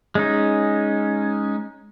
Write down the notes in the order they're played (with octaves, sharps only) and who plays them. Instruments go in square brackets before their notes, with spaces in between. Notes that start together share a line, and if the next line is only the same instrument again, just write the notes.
[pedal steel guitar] G#3 C#4 D#4